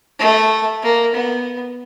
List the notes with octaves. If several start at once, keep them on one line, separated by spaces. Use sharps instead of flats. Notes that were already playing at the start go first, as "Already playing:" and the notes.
A3
A#3
B3